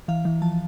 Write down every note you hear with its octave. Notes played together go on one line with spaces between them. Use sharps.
E3 F5
E3
F3 A5